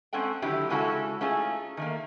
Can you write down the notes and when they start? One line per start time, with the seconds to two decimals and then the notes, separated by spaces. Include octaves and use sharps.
0.13 G#3 C4 C#4 A4 F#5 G5
0.42 D3 D#3 F#3 E4 G4
0.70 C#3 G#3 C#4 E4 F#4 A4
1.21 A3 C#4 D#4 F4 G#4
1.77 D#3 A3 A#3